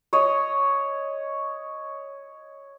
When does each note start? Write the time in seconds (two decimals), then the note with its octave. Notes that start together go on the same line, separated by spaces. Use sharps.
0.13 C#5 D#5